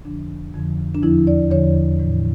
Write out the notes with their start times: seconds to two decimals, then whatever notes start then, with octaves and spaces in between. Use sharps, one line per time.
0.05 F2 D3 F3 D4
0.54 F2 D3 F3
0.95 D4
1.03 E2 D3 F3 E4
1.27 D5
1.50 E2 D3 F3 C#5
1.99 A2 E3